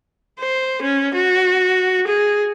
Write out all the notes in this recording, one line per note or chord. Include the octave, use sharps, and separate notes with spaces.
C5
C#4
F#4
G#4